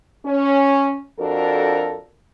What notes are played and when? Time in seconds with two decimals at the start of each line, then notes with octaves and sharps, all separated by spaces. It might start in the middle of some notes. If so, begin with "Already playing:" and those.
0.26 C#4
1.19 F2 D4 F#4 A4 A#4